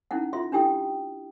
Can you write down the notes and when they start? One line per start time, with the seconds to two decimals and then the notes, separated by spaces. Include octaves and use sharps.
0.11 C#4 D#4 E4 F#5
0.33 F4 E5 C6
0.52 D4 E4 G4 G5 D#6